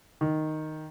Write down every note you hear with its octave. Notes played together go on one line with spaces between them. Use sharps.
D#3